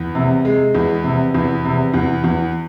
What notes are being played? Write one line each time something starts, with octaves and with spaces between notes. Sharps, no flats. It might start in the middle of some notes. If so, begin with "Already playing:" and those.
Already playing: E2
C3
G#3
E2
C3
E2
C3
E2
E2